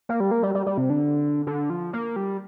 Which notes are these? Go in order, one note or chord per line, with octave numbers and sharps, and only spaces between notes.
A#3
G3
A#3
G3
G3
G3
C3
D3
D3
F3
A#3
G3